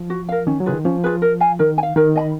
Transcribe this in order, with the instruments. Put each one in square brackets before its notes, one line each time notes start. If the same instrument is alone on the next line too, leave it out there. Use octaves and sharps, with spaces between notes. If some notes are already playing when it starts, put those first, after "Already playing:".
Already playing: [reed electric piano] F3
[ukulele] F#4
A#4 F5
[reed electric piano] D#3 [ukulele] C#4
[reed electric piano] F#3
[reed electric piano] C#3 [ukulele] F4 G#4 B4
[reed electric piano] D#3
[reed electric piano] F3 [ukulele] C#4
[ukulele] F4 G#4 B4
A#4
F5 G#5
[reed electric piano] D#3 [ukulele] A#4
[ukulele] G#5
F5
[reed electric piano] D#3 [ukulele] A#4
[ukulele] D#5 G#5 B5